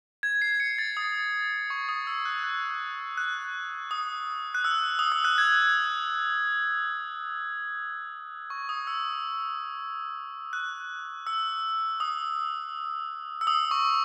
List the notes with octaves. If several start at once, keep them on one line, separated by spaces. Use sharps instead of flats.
G#6
C7
C#7
A6
D#6
C#6
D#6
E6
F#6
F#6
F#6
D#6
F#6
E6
D#6
E6
F#6
G#6
C#6
D#6
E6
F#6
E6
D#6
E6
D#6
C#6